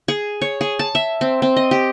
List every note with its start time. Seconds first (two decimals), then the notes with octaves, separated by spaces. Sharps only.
0.08 G#4
0.41 C#5
0.61 G#4
0.79 A5
0.95 E5
1.21 C4
1.42 C4
1.56 D#5
1.71 G4